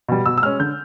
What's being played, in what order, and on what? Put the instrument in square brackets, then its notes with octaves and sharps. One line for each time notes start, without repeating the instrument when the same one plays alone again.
[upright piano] B2 G3
B2 E6
E6
G#3 C#4 F6
D3 G6